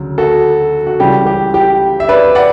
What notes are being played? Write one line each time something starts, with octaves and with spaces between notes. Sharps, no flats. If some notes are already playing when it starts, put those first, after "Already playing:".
Already playing: D2 C#3 F#3
F#4 A4
F#4
C#2 C#3 E3 G3 G4
G4
G4
E5
B4 D5
D5 F#5